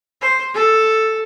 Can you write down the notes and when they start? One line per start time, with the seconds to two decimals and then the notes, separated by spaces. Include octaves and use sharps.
0.21 C5
0.54 A4